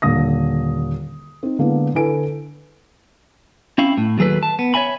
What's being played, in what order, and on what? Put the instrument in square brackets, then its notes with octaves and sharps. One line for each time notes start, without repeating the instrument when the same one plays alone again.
[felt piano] D#1 D3 A#3 D#6 A#6
C4 D#4
D3 G#3 A#3 B3 E4
D3 E4 A4 B4 G#5 D7
[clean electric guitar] C4 C#4 E4 F5
A2
D#2 F#3 G#4 A4 B4
A5
B3
C#5 D#5 E5 G#5 B5